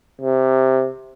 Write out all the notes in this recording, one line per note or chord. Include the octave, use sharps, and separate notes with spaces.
C3